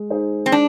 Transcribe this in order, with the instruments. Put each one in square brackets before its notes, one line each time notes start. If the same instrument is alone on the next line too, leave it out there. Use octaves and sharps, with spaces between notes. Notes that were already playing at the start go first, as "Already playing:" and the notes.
Already playing: [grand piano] G#3
D#4 G#4 C5
[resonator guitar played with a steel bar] C4
D4